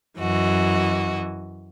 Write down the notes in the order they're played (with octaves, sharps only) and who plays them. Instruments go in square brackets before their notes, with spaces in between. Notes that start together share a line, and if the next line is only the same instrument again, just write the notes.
[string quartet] F#2 E3 F#4 D#5